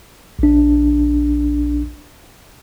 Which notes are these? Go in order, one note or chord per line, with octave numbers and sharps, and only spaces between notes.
A#1 D4